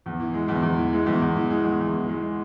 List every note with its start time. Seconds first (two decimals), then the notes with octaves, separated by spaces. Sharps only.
0.06 E2
0.20 E3
0.34 G#3
0.48 E2
0.63 E2
0.77 E3
0.93 G#3
1.06 E2
1.22 E2
1.36 E3
1.50 G#3
1.65 E2
1.80 E2
1.94 E3
2.09 G#3